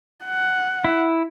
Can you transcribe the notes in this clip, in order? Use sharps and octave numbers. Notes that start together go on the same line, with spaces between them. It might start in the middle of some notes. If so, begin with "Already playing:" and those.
F#5
E4